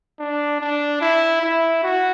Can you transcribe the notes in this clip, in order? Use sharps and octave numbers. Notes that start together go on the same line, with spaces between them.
D4
D4
E4
E4
F#4